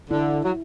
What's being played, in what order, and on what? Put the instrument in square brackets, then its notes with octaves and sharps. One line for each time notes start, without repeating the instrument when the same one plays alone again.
[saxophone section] D3 [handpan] E4
[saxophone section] F#3